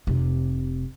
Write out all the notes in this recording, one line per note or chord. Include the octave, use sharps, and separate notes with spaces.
F1 C3